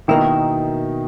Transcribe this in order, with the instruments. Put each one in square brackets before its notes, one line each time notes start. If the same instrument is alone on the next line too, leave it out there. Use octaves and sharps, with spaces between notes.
[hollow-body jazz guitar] B2 A#3 E4 [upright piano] D#3 D#4